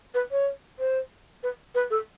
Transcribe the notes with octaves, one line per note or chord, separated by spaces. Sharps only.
B4
C#5
C5
B4
B4
A4